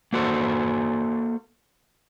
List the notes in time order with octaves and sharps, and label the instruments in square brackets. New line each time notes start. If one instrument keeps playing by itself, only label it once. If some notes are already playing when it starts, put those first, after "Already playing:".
[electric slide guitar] A#3 F#4 A4 C5